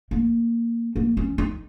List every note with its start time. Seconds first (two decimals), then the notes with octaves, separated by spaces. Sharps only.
0.11 A#3
0.96 A#3
1.17 C#4
1.38 D#4